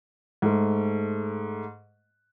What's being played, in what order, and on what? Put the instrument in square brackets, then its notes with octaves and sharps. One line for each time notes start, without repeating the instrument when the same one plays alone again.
[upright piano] G#2 A3